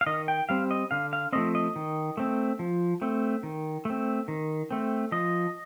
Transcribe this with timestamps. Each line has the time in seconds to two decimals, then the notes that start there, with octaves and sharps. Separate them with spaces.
0.01 F5
0.06 D#3 D#5
0.28 G5
0.49 G3 C4 F5
0.71 D#5
0.91 D3 F5
1.13 F5
1.33 F3 A3 C4 D#5
1.55 D#5
1.76 D#3
2.17 A3 C4
2.59 F3
3.02 A3 C4
3.43 D#3
3.85 A3 C4
4.28 D#3
4.71 A3 C4
5.12 F3 D#5